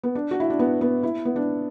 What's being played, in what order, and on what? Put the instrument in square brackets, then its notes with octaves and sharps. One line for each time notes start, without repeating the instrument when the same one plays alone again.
[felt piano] B3
D4
F#4
E4
D4
B3
B3
E4
B3
D4